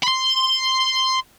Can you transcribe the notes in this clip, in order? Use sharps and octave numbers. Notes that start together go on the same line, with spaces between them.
B5 C6